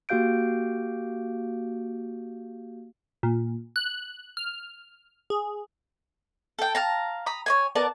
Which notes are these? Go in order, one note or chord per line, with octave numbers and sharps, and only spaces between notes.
A#3 F#4 G4 F5 G6 D7
A#2
F#6
F6
G#4
A4 G5
F5 A5 A#5
A#5 B5 D#6
C#5 D#5 G#5
B3 A#4 D5 A5